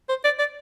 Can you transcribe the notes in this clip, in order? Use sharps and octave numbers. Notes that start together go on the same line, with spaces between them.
C5
D5
D5